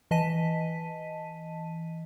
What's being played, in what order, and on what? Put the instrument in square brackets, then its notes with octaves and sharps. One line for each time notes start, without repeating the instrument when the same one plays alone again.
[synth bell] E3 D#5 A5 B6 D#7